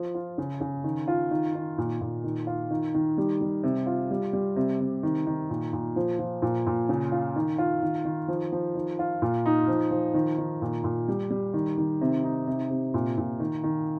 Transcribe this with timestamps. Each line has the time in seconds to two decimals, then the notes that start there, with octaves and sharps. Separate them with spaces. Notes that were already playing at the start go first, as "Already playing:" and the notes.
Already playing: F3
0.14 F4
0.38 C#3
0.61 C#3
0.84 D#3
1.08 F4
1.31 D#3
1.55 D#3
1.78 A#2
2.01 A#2
2.24 D#3
2.47 F4
2.70 D#3
2.94 D#3
3.18 G3
3.41 G3
3.63 C3
3.86 F4
4.11 G3
4.33 G3
4.56 C3
4.80 C3
5.03 D#3
5.27 D#3
5.50 A#2
5.73 A#2
5.96 F3
6.19 F3
6.42 A#2
6.67 A#2
6.89 C#3
7.12 F4
7.36 D#3
7.58 F4
7.83 D#3
8.05 D#3
8.28 F3
8.52 F3
8.75 D#3
8.99 F4
9.22 A#2
9.46 D#4
9.68 F3
9.91 F3
10.14 D#3
10.38 D#3
10.62 A#2
10.84 A#2
11.08 G3
11.30 G3
11.54 D#3
11.78 D#3
12.01 C3
12.24 D#4
12.47 C3
12.70 C3
12.94 A#2
13.18 A#2
13.40 D#3
13.64 D#3